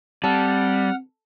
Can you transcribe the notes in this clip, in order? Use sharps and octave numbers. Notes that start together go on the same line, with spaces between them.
G3 C4 A4 F#5 F6